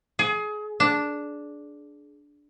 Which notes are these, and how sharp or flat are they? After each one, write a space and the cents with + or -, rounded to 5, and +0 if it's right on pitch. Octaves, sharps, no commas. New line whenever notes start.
G#4 +25
D4 -5